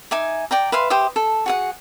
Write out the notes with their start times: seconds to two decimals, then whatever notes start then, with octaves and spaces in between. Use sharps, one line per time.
0.11 D#4 E5 G#5 D6
0.51 D5 G5 A#5
0.72 B4 E5 F5 C6
0.90 G4 C5 E5 D#6
1.16 A4
1.46 F#4 G#4 F#5